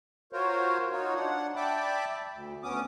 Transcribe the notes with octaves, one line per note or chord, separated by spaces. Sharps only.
F4 F#4 A#4 C5 C#5
D#4 F4 F#4 C#5
D4 F#5
D5 E5 G5 A5 B5 D6
D2
D2 B3 C#4 D6 D#6